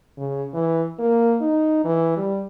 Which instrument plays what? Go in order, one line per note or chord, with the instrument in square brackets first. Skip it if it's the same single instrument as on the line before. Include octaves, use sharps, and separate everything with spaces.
[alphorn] C#3
E3
A#3
D#4
E3
G3